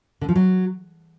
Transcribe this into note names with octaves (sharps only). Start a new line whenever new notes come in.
D3
F3
F#3